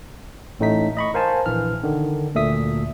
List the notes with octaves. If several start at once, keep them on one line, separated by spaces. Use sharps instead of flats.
A1 A2 A3 D#4 B6
D#5 B5 C#6
A#4 C5 F5 G#5 A5
A#1 E3 F6
D3 D#3
D2 A#2 A3 E5 D#6 B6